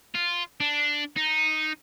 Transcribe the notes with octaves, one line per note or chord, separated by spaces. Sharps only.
F4
D4
D#4